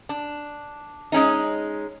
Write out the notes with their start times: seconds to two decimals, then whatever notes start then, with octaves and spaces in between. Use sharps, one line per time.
0.09 D4
1.12 G#3 C#4 D#4